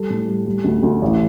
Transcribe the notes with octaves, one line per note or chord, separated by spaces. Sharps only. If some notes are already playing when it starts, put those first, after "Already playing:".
Already playing: G3 A4
A2
G3
G3
D2
D2
A1